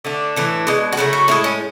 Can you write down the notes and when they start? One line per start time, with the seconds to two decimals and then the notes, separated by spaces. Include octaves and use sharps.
0.05 D3 A3 D4
0.36 A2 E3 A3
0.67 B2 G#3
0.92 F#4
0.97 C#3 F#3 A3 E4
1.13 F#4
1.28 A2 G#3 E4
1.44 C#4